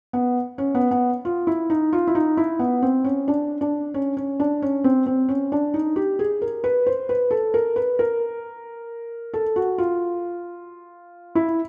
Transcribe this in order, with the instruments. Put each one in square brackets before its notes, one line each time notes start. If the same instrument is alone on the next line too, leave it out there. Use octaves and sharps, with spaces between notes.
[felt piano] B3
C#4
B3
B3
F4
E4
D#4
F4
E4
D#4
E4
B3
C4
C#4
D4
D4
C#4
C#4
D4
C#4
C4
C4
C#4
D4
D#4
G4
G#4
A#4
B4
C5
B4
A4
A#4
B4
A#4
A4
F#4
F4
E4